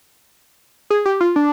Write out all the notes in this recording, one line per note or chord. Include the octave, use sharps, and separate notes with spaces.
G#4
G4
F4
D4